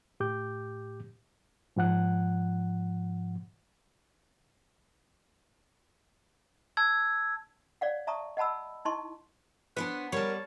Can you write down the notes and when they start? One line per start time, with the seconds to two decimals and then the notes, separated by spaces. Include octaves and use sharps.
0.20 A2 G4 D6 G6
1.76 G#2 F3 F#5 F#6
6.77 A5 E6 G#6
7.81 C#5 D5 F5 F#5
8.07 E5 A5 A#5 C#6 D#6
8.37 D#5 F#5 A5 B5 E6
8.85 D#4 E4 D#5 A5 C6 C#6
9.77 B3 D4 C5 C#5 F#6
10.12 G3 A#4 C#5 D5 A5